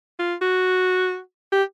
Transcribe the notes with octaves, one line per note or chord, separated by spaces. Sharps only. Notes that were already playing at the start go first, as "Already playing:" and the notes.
F4
F#4
G4